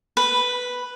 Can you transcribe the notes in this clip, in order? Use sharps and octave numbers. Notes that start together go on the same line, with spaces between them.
B4